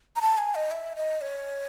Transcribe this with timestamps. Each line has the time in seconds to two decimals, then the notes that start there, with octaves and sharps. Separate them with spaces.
0.16 A#5
0.21 A5
0.38 G#5
0.55 D#5
0.71 E5
0.96 D#5
1.21 C#5